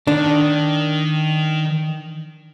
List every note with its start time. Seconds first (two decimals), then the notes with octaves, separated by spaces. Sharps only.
0.07 D#3 D4